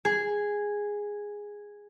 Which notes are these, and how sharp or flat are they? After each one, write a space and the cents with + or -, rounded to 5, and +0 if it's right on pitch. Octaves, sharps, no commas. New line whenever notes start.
G#4 -5